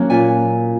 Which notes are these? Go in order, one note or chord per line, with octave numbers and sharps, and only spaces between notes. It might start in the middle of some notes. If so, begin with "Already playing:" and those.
Already playing: F#3 A#3 C#4
A#2 G#5